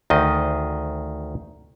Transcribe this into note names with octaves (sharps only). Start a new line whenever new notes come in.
D2 D#3 D#5